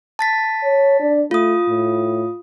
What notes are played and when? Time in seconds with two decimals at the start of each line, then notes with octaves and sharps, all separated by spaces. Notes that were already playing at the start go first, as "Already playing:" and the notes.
0.19 A5 A6 B6
0.64 C#5
1.00 D4
1.31 A3 F4 D#6
1.68 A2